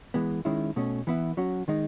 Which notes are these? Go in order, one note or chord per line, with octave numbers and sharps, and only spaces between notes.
E3 G#3 B3
D#3 G#3 C#4 E4
B2 A3 C#4
E3 B3 E4
F#3 C#4 F#4
D#3 G#3 D#4